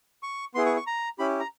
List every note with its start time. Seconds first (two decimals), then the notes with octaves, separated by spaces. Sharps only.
0.23 C#6
0.54 B3 E4 G#4 C6
0.66 C#6
0.77 C#6
0.87 A#5
1.19 C#4 E4 G4 B5
1.40 A#5